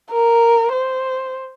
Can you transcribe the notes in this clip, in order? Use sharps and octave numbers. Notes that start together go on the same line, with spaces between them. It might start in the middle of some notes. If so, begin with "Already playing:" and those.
A#4
C5